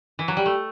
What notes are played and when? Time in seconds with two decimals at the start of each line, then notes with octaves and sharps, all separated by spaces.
0.19 E3
0.28 F#3
0.37 G3
0.46 A3